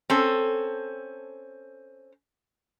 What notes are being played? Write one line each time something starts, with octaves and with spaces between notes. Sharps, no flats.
C4 C#4 A4